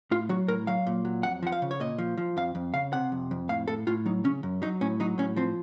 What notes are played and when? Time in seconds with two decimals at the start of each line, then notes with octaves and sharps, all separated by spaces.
0.11 A2 F4
0.29 F#3 F#4
0.48 A2 A#4
0.67 F#3 F5
0.87 A#2
1.05 F#3
1.23 F2 F#5
1.43 F3 F#5
1.52 F5
1.62 C#3
1.71 C#5
1.80 A#2 D#5
1.98 F3
2.18 F3
2.37 F2 F5
2.55 F2
2.74 C#3 F5
2.93 C3 F#5
3.12 F2
3.31 F2
3.49 A2 F5
3.68 A2 A4
3.87 A2 F4
4.06 F#3 D#4
4.24 C#3 C#4
4.43 F#2
4.62 F#3 D#4
4.81 A2 C#4
5.00 F#3 D#4
5.18 A2 C#4
5.36 F3 C4